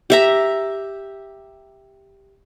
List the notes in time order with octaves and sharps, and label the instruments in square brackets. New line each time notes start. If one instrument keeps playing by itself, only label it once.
[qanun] G4 E5 A#5